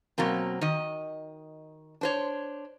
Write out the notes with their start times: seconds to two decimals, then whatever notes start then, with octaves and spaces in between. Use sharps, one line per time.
0.18 B2 F#3 A#3 C4
0.61 D#3 D#5
2.01 D4 C5 C#5